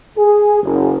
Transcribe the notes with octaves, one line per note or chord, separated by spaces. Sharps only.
G#4
F#1